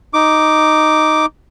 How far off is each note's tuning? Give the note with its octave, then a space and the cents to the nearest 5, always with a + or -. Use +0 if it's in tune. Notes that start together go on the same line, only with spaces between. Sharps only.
D#4 +0 D6 +0